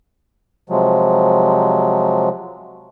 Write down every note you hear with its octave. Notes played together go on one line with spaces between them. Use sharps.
C3 F3 F#3 G#3